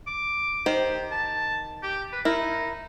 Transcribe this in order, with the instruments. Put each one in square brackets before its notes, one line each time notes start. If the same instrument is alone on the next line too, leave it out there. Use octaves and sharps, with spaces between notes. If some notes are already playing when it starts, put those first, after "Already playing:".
[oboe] D6
[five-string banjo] D#3 C5 [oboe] G4
[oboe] A5
G4
B4
[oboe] D#4 [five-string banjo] E4 A#4